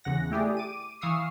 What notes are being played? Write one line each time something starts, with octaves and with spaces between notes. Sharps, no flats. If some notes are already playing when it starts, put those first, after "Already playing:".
E2 C#3 F#5 A#6
A3 E4 G4 G#4 D5
D6 D#7
E3 F5 C#6 D#6 E6 C7